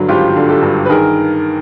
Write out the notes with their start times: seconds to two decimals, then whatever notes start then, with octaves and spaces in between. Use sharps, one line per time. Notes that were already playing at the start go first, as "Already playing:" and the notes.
Already playing: G2 D3 F#3
0.09 G#1 F4 G4
0.36 D3
0.49 G4 A4
0.62 G2
0.85 B4
0.90 D#3 G#4 A#4